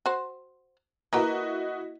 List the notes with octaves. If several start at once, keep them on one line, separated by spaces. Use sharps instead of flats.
F#4 C5
A#3 E4 F#4 A#4 B4 D#5